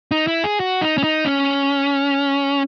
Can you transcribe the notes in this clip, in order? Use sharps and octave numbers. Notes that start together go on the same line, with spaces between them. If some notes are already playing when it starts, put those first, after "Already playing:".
D#4
E4
G#4
F#4
D#4
C#4
D#4
C#4